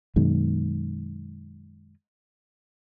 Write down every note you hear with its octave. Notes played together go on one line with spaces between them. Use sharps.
F#2 B2 D#3 G#3